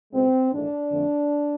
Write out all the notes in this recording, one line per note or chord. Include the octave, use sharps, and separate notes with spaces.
C#2 B2 G#3 C4
A#1 G#2 E3 A3 D4
F2 D3 F3 A3